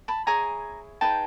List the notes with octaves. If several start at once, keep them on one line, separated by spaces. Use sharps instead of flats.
A5 B5
E4 G#4 C#5 G#5 A#5
D#4 G#4 B4 G5 A5